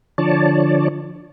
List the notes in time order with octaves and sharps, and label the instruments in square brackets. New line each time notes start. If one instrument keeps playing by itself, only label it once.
[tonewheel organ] D3 F3 C#5 D5 A5